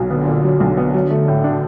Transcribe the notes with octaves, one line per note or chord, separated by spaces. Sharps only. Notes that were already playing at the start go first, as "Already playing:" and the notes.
Already playing: B1 A#2 F#3
D3 B3
A#2
F#3
B1
B3
F#3
A3
A2
D4